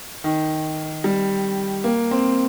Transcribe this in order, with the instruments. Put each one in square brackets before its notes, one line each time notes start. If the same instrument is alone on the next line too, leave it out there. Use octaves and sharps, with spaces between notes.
[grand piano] D#3
G3
A#3
C4